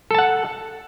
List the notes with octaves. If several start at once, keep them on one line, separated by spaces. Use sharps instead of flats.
A4 F#5 A5